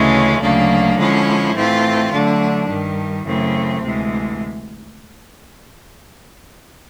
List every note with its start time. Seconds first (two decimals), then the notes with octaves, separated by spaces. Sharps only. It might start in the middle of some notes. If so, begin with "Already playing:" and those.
Already playing: D2 C#3 E3 G#3 C#4
0.41 D2 C#3 F#3 A#3 D4
0.98 D3 F3 G#3 C#4 E4
1.55 A2 E3 A3 C4 F4
2.11 D3 F#3 A3 D4
2.68 G2 D#3 G3
3.25 F#2 C#3 E3 A3 C4
3.82 D2 C3 E3 G#3